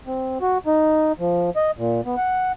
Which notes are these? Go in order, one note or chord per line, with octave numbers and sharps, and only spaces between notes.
C4
F#4
D#4
F3
D#5
A#2
B3
F#5